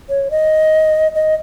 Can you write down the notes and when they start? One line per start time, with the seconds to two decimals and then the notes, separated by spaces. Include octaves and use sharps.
0.09 C#5
0.31 D#5
1.15 D#5